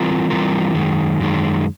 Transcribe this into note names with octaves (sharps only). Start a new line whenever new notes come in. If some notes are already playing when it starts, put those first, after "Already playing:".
Already playing: E3 G3 C4 F4 A#4
E3 G3 C4 F4 A#4
F#2 D#3 G#3
F#2 D#3 G#3